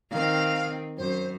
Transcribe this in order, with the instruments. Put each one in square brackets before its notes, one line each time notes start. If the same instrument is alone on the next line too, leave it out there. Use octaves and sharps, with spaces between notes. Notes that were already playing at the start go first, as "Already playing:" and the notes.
[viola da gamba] D#3 C4 [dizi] F5
[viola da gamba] F#2 [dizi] C5